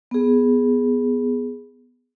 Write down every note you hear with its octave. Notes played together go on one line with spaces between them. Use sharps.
B3 G#4